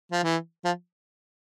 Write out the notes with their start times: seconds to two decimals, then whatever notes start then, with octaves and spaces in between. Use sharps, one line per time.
0.12 F3
0.23 E3
0.65 F3